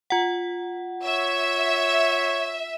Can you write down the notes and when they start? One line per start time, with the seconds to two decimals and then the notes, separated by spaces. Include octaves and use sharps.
0.10 F4 F#5
1.03 C#5 E5